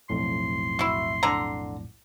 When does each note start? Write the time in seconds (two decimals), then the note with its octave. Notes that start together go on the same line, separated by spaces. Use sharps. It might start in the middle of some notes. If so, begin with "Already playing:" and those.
0.10 B1 F2 A2 C6
0.79 E4 F#4
1.23 D3 A#5